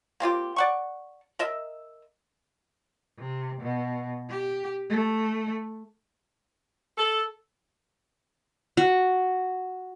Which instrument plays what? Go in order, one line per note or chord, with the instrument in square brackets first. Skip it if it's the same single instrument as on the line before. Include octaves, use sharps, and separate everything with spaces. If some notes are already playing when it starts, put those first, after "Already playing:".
[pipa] A#3 C4 F4 G4
D5 F#5 C#6
A#4 D#5 E5
[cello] C3
B2
G4
A3
[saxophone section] A4
[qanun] F#4